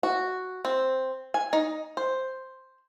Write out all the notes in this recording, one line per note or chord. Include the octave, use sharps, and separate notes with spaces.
F#4
C4
G#5
D#4
C5